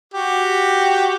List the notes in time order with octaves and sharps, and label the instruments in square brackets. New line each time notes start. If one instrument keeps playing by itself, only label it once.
[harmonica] F#4 G4